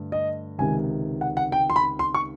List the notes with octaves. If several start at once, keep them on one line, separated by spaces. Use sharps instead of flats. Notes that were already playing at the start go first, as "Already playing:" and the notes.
Already playing: G2 D3 A3
D#5
C#2 C3 D#3 G#5
F#5
F#5
G5
C6
B5
C6
C#6